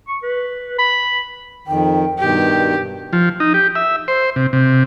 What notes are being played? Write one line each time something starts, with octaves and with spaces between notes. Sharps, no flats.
C#6
B4
B5
F2 D#3 G5
G2 B2 D#3 G4
F3
D#4
G4
E5
C5
C3
C3